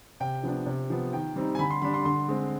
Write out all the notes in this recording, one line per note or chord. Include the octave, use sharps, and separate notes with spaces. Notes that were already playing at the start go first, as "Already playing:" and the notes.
C3 G5
F3 B3 D4
C3
F3 B3
D#3 G5
G3 C4 D#4
G#5
D3 B5
C6
G3 D4 B5
C6
D3 C6
G#3 C4